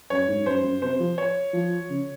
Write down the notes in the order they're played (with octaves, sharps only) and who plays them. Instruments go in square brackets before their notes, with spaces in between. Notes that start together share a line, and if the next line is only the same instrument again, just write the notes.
[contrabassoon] F#2 [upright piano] C#5
[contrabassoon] G#2
[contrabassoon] F#2 [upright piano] C5
[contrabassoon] F#2
[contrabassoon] C3 [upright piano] C5
[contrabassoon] F3
[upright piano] C#5
[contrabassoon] F3
C#3